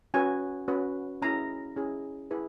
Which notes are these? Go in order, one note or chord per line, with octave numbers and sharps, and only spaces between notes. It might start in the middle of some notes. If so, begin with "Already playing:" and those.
C#4 F#4 B4 G#5
C#4 F#4 B4
C#4 E4 G#4 A#5
C#4 E4 G#4
E4 G#4 B4